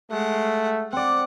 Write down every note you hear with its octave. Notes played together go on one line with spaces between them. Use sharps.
G#3 A3 F#5
C4 D5 F#5